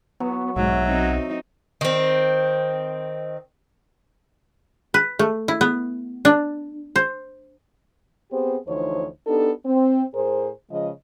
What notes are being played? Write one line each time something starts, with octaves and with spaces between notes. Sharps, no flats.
F#3 B3
B1 G#2 F#3 E5
C4 D#4
D#3 C4
B4
A3
E4
B3
D4
C5
B3 C4 G4 G#4 C5
D2 E3 F3 D#4 C5 C#5
B3 D4 D#4 G4 A4
C4
A2 G#4 A#4 C5
C#3 F3 G#3 D#5